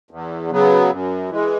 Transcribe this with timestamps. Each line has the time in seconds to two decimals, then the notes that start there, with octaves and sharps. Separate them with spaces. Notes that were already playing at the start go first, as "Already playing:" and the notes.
0.11 E2
0.51 C#3 F#3 B3
0.90 F#2
1.30 E3 G#3